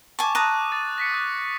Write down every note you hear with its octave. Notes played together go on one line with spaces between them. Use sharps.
G#5 A5 C#6 D6
A5 A#5 D#6 F#6 D#7
D#6 A6 D#7
A#6 B6 C#7
D#6 F#6